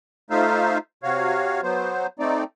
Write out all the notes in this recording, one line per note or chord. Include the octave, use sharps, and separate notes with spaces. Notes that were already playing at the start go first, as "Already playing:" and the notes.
A3 D#4 F4 C5 E5 F5
C3 F#4 C#5 F5
F#3 B3 C5
A3 C4 D#4 D5